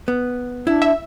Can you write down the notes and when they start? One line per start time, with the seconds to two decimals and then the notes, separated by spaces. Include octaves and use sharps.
0.08 B3
0.67 D4 E4
0.82 E5